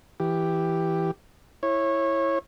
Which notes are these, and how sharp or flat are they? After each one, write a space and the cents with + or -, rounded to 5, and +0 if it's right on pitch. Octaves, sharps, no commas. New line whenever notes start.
E3 +0 G4 +0
E4 +0 C#5 -20